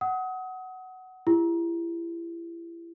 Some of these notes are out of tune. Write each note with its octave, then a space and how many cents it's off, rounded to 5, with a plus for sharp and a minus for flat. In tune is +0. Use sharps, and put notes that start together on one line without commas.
F#5 +10 D#6 +30
E4 +30 G4 +40